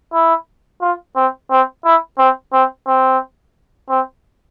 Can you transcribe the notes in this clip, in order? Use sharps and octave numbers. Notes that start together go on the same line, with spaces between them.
E4
F4
C4
C4
E4
C4
C4
C4
C4